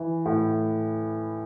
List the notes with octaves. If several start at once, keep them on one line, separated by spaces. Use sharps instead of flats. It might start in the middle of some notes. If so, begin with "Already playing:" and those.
Already playing: E3
A2